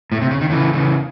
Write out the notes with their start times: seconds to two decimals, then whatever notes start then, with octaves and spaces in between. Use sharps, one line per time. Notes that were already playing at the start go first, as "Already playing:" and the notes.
0.12 A2
0.21 C3
0.31 C#3
0.41 D#3
0.50 C#3 E3
0.73 C#3 E3